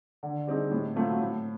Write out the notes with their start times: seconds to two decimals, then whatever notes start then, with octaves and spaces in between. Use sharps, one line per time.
0.23 D3
0.47 G3 C4 D#4 G#4
0.71 A2
0.96 F#3 A3 C4 F4
1.20 A2